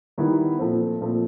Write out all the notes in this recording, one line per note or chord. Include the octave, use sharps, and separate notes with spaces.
D#3 G3 B3 E4
A#2 F3 A3 C4
A#2 F3 A3 C4